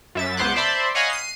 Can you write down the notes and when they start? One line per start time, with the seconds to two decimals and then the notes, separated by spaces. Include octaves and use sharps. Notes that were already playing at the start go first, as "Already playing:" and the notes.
0.15 F#2 E5 A6
0.37 C#2 B3 C5 C6 D6 F#6
0.56 C5 D5 E5 A5 B5 C6
0.95 C#5 D#5 F5 F#5 G#5 B5
1.10 C7 D#7